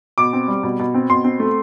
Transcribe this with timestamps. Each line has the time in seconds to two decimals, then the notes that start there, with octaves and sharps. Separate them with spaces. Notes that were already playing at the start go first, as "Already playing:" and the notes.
0.18 B2 D6
0.33 C4
0.48 G3
0.63 B2
0.79 B2
0.94 C4
1.10 B2 C6
1.24 C4
1.40 A3